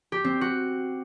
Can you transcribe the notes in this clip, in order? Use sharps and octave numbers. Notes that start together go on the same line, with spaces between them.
G4
C4
F#4